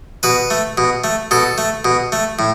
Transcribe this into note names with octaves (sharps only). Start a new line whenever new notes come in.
B2 B4
A3
B2
A3
B2 A4
A3
B2
A3
A2